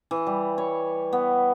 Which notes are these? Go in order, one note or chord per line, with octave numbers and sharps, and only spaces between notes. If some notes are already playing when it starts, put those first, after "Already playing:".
E3
G3
C#5
B3